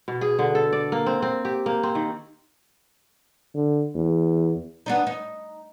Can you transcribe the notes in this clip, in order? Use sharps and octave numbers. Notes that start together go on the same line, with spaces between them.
B2
G#4
D3
A4
D5
A#3
C4
C4
G4
A#3
C4
D#3
D3
E2
B3 D4 D#4
D#4